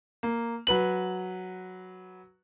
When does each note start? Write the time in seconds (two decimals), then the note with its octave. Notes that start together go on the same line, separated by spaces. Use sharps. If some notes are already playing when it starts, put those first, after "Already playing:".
0.23 A#3
0.67 F#3 B4 F#7